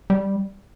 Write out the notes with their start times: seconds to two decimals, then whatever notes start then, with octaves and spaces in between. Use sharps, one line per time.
0.10 G3